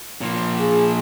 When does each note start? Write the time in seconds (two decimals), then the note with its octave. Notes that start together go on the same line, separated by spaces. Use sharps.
0.21 A#2 F3
0.60 G#4